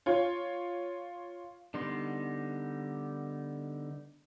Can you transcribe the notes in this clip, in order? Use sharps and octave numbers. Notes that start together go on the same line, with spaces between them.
F4 C#5
D3 G3 B3 D#4 C6